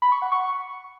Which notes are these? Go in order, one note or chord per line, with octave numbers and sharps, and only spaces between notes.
B5
C#6
F#5
C#6